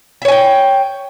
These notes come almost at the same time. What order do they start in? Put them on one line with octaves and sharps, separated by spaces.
E5 C#5 G#5 G5